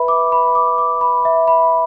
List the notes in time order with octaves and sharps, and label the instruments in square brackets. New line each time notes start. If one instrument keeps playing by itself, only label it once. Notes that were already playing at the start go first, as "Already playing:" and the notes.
Already playing: [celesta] B4 E5 B5
D6
B5
D6
D6
B5
E5
B5